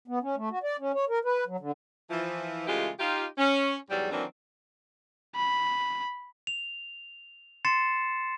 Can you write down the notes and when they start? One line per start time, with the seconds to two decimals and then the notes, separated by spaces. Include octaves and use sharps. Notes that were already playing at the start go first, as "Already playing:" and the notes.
0.08 B3
0.22 C#4
0.36 A3
0.50 F#4
0.63 D5
0.79 C#4
0.95 C#5
1.09 A#4
1.25 B4
1.47 F#3
1.60 D3
2.10 E3 F3
2.67 C#3 E3 G#3 A3 F4 G4
2.99 D#4 F4 G4
3.38 C#4
3.90 E2 G#2 F#3 G3
4.12 D#3 E3 F#3 A#3 C4 D4
5.36 B5
6.47 F7
7.65 C6 A6 C7 C#7 E7